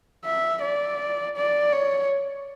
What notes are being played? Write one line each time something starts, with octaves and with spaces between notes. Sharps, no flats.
E5
D5
D5
C#5